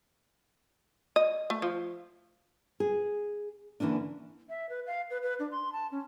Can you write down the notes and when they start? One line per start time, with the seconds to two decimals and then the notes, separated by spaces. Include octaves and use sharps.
1.16 D#5
1.50 A3
1.62 F3
2.80 G#4
3.80 D3 E3 A#3 C#4 D4
4.49 E5
4.69 B4
4.87 F5
5.10 B4
5.23 B4
5.39 D4
5.51 C6
5.72 A5
5.91 C#4